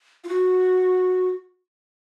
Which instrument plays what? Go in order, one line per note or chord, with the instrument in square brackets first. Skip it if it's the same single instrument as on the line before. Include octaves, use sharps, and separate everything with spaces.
[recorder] F4
F#4